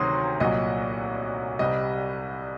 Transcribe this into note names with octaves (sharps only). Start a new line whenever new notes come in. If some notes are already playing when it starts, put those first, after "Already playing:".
Already playing: D2 C3 D#3 F#3 C6 D#6
C2 A#2 F#3 D#5
C2 C3 G3 D#5